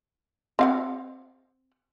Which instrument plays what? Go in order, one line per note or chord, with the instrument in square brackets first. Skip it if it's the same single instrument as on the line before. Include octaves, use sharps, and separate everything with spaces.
[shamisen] C4 F5 F#5